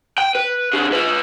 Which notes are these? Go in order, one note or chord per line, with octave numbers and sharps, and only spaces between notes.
G5
B4
D3 G#4
F4 B4